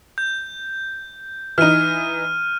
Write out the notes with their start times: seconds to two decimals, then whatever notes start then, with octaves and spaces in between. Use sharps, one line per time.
0.18 G6
1.58 E3 D#4 F6 D#7